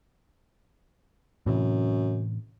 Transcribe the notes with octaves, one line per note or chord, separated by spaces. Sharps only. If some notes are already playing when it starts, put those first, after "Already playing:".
F#2 A2 C3 E3